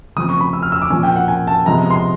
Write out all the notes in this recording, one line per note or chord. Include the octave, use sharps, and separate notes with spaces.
C#3 F3 A3 C4 D#6
C#6
B5
E6
F6
E6
D6
A#2 F3 A#3 G#5
G5
F#5
G#5
A5
C3 F3 G#3 B3 A#5
C6